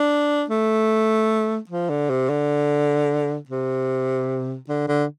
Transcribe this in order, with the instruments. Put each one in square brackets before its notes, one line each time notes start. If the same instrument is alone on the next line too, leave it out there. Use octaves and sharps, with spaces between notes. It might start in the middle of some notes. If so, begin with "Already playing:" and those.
Already playing: [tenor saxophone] D4
A3
F3
D3
C3
D3
C3
D3
D3